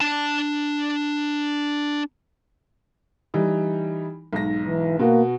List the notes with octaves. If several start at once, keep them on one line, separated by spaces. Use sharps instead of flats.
D4 A5
E3 G3 D#4
B1 G#2 A#6
E3
B2 A#3 F#4